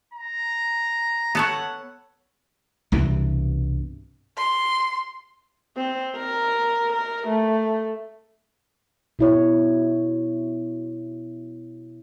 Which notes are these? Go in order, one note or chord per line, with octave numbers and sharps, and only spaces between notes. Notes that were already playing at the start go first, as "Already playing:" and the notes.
A#5
B3 A4 C#5 F#5
C2 G2 B2 E3
C6
C4
A#4
A#4
A3
B2 E4 C#5